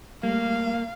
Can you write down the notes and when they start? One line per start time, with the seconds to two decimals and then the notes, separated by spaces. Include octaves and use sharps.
0.23 G3 A3 A#3 F5